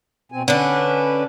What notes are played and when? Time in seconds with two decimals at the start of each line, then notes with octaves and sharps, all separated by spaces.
0.32 B2 C4 G#5
0.48 D3 C#4 D4 B4